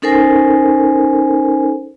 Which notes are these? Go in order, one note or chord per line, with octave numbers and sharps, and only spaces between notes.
C#4 D#4 A4 A#4 C5 G#5